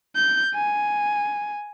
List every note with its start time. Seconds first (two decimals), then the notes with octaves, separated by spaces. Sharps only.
0.16 G6
0.55 G#5